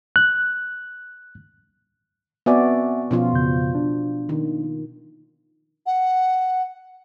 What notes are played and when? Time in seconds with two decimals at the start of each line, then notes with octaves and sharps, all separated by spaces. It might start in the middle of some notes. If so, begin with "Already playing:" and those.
0.16 F#6
2.46 B3 C4 F#4 D5 E5 G#5
3.11 B2 F3 C#4 F4
3.33 F2 C#3 G6
3.75 D4
4.29 D#3
5.86 F#5